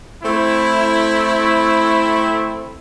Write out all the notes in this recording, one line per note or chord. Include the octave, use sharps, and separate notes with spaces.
A3 C4 E4